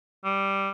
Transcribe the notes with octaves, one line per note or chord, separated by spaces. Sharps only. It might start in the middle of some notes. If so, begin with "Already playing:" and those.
G3